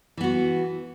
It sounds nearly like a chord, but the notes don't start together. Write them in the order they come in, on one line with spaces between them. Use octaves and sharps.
E3 B3 F#4